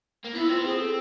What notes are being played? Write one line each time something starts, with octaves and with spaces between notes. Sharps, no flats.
A#3
B3 E4
C4 F4
B3
C4 G#4
A4